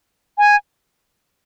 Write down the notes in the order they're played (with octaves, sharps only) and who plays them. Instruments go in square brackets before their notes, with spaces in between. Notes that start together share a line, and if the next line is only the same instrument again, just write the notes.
[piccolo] G#5